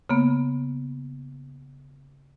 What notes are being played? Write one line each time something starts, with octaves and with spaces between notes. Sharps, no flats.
C#3 A#3 B3